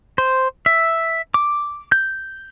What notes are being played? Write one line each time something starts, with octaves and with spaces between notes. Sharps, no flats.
C5
E5
D6
G6